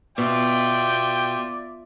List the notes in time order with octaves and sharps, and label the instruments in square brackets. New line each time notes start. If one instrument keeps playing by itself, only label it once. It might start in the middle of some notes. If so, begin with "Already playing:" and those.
[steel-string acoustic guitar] B2 [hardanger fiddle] F4 E5 [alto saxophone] D5 [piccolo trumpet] G5